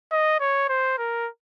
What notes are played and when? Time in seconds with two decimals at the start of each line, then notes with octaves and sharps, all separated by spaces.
0.12 D#5
0.40 C#5
0.69 C5
0.98 A#4